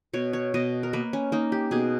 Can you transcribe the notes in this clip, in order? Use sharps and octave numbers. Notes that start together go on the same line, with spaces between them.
B2 C#5
C#5
B2 D#5
A#4
A#3 B4
C#4
A#3 D#4
G4
B2 G#4